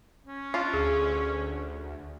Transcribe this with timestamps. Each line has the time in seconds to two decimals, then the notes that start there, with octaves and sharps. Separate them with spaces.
0.27 C#4
0.54 D4 F4
0.74 D2 G#4